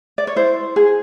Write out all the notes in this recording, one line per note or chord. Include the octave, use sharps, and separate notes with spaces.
D5
C#5
E4 C5
G#4